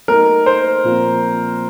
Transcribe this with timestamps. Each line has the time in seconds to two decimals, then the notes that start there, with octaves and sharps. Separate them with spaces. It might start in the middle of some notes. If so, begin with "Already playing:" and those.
0.08 F#3 A3 D#4 A#4
0.46 C5
0.84 A#2 F3 C4 F4 A#4